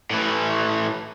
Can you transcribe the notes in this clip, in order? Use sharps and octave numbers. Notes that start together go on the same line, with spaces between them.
A2 E3